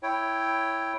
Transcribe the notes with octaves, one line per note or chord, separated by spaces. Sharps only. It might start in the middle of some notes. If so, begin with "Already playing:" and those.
E4 C#5 G5